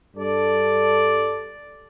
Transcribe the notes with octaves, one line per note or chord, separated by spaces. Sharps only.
G2 A4 D5